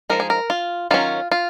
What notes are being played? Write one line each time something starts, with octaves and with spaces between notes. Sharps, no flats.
F3 G#3 D#4 A#4
G#4
A#4
F4
D#3 F#3 C#4 F4
F4